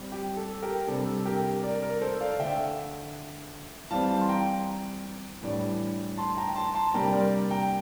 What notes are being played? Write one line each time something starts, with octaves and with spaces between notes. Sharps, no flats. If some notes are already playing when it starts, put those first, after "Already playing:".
Already playing: G3 C4
G4
A4
G4 A#4
C3 G3 D4 A4
G4 A#4
A#4 D5
A#4 D5
A4 C5
D5 F5
D3 A3 D4 E5 G5
E3 G3 C4 F5 A5
C6
G5 A#5
A2 E3 G3 D4
A5 C6
G5 A#5
A5 C6
A5 C6
C3 G3 A#3 D4 G5 A#5
A#4 D5
G5 A#5